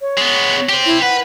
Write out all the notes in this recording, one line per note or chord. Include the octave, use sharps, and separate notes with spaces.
C#5
G#3 B3
G4 C5
E4
B4 F#5